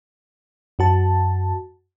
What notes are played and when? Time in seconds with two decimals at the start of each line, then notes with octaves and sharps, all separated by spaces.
0.79 F#2 F#4 A5